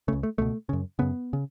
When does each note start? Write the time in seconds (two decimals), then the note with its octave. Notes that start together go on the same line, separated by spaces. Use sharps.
0.08 C#3 A3
0.13 C#2
0.23 A3
0.38 C#2 B2 A3
0.69 F#2 C#3
0.99 F#2 C#3 B3
1.33 C#3